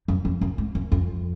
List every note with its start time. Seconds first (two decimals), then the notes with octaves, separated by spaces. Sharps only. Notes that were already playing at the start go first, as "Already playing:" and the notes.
0.08 F#2
0.25 F2
0.41 F#2
0.58 G#2
0.75 F#2
0.92 F2